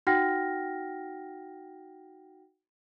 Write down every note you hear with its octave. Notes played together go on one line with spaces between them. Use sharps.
D#4 F#4 F#5 G5 F6 A#6